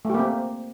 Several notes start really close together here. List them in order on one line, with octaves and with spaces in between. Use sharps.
A3 G4 A#3 C4